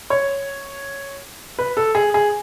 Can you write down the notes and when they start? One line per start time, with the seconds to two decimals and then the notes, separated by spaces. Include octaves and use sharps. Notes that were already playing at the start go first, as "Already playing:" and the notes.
0.10 C#5
1.59 B4
1.77 A4
1.95 G#4
2.14 G#4